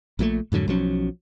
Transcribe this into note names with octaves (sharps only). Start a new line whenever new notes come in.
A#1 A#2 E3 A3
F2 G#2 D3 F#3
B1 F3 F#3 C#4